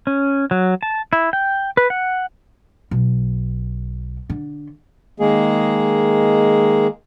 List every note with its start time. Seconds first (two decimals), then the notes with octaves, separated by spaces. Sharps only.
0.07 C#4
0.51 F#3
0.83 A5
1.13 E4
1.33 G5
1.77 B4
1.90 F#5
2.91 B1
4.30 D3
5.20 D#3 G#3 A#3 G#4